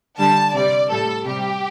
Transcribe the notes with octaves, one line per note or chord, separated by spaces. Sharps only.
D3 G3 A5
C3 G3 D5
A2 G3 A4
C3 G3 G4